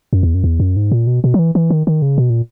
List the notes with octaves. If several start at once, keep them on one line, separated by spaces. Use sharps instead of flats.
F#2
E2
F#2
E2
F#2
G#2
A#2
B2
B2
F#3
E3
E3
D#3
D#3
C#3
B2
A#2